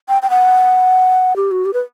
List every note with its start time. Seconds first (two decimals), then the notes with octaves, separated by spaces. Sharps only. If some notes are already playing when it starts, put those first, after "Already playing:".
0.09 G5
0.22 G5
0.30 F#5
1.36 G4
1.51 F#4
1.65 G4
1.73 B4